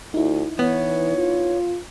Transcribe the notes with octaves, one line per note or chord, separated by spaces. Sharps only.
D2 D#4 E4
E3 B3 C#5
F4